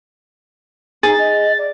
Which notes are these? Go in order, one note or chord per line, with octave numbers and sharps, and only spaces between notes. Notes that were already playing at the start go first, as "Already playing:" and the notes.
D#4 G#4 A6
D#5
D5